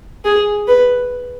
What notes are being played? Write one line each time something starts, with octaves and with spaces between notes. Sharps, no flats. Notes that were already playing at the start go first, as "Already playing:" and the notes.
G#4
B4